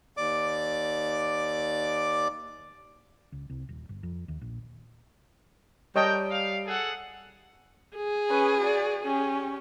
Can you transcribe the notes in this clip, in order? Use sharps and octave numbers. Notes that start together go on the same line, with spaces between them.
D#2 D5 D6
C#2
C2
D#1
G1
F2
D#2
A#1
G3 A#4 C#5 D#5 G5 A5
F5
G#4 A4 F#5
G#4
C#4 B4
F#4 D5
C#4 G4